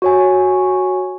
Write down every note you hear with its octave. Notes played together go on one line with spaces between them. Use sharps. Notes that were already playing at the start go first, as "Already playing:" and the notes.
F#4 C#5 G#5